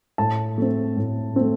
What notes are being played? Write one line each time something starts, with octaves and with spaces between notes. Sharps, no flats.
A2 A5
A3 C4
A2
A3 C4